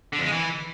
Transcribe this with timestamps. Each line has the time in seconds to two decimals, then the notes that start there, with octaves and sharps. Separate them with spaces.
0.13 D3
0.19 F2
0.25 G#3
0.32 E3